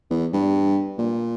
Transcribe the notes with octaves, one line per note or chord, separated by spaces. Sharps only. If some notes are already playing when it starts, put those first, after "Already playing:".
E2
G2
A#2